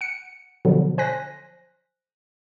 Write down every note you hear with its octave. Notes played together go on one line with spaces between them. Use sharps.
F#5 C#7
B2 D3 F3 F#3
C5 G#5 F#6 A#6 B6